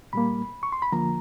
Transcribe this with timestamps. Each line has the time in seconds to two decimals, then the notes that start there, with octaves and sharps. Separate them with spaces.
0.13 A#2 G3 A#3 B5
0.63 C#6
0.72 C6
0.82 B5
0.92 D3 F3 A#3 A#5